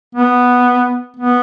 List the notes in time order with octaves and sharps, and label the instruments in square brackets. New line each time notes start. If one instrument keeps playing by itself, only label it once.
[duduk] B3
B3